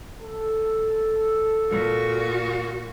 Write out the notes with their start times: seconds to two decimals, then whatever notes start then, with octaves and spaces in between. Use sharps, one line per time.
0.20 A4
1.71 A#2 F#4